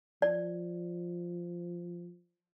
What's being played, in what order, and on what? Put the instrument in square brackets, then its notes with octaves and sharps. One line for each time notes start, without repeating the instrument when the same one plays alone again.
[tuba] F3 [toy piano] D5